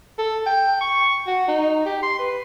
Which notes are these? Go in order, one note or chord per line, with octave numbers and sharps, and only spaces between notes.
A4
G5
C#6
F#4
D#4
G4
C6
B4